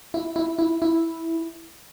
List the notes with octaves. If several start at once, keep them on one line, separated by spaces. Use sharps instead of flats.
E4
E4
E4
E4